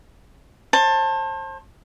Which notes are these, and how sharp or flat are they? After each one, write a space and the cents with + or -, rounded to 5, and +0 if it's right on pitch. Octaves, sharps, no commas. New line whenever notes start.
C5 +35 A5 +10